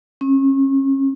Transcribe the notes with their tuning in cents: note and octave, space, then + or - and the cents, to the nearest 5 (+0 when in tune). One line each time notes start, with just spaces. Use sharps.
C#4 -35